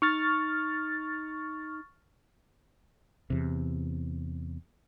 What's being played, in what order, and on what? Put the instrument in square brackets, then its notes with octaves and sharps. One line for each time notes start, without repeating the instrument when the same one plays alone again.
[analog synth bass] D#4 [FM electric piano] C#6 F6 A6
[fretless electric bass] E2 C3